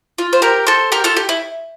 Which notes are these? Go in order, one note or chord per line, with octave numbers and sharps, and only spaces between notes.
F4
C5
G4 A#4
A4 C5
G4 A#4
F4 A4
G4
E4